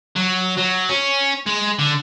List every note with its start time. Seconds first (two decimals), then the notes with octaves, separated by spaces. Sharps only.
0.16 F#3
0.57 F#3
0.89 C#4
1.47 G#3
1.79 D3